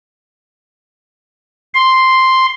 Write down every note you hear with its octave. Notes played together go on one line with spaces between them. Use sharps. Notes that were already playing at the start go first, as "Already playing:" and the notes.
C6